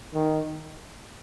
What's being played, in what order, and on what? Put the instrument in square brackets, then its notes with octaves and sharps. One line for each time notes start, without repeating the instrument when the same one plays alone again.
[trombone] D#3